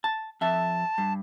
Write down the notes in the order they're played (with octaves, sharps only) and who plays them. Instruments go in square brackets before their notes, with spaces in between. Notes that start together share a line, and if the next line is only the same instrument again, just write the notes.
[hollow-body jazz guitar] A5
[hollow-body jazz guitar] F2 E5 [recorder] A5
[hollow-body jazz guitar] G2